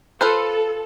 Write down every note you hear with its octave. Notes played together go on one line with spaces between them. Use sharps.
F4 A4 B4 C5